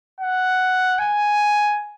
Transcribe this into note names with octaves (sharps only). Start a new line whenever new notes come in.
F#5
G#5